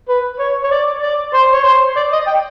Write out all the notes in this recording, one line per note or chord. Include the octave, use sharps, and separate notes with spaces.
B4
C#5
C#5
D5
D5
C5
C#5
C5
D5
D#5
G5